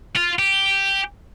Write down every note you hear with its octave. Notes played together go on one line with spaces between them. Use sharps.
F4
G4